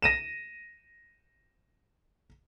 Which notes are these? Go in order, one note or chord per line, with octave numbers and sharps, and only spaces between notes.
A#6 D#7 E7